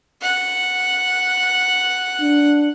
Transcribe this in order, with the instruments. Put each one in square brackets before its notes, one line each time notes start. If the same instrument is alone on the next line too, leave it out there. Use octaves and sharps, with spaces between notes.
[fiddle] F#5
[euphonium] D4